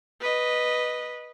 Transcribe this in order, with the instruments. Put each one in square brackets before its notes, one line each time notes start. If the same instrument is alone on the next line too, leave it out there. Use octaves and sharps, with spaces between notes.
[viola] B4 D#5